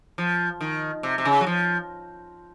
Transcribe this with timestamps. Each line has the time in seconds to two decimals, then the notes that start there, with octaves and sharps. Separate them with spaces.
0.18 F3
0.61 D#3
1.03 C3
1.18 C3
1.25 C#3
1.41 F#3
1.47 F3